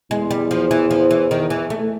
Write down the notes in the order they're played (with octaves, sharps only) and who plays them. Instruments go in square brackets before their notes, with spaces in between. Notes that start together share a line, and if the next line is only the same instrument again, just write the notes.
[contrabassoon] E2 [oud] G#3
[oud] G3
F3
E3
F3
E3
D#3
E3
A3